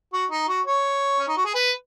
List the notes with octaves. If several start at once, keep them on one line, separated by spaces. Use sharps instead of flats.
F#4
D#4
F#4
C#5
C#4
D#4
F#4
G#4
B4